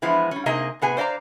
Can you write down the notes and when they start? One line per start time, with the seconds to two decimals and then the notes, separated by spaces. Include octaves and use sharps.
0.02 E3 F3 G#3 B3 E4
0.31 G3 C#4
0.46 C3 A#3 D#4 G#4 D#5
0.82 A2 C3 B3 G#4 G#5
0.97 C5 D5 D#5 F5 A#5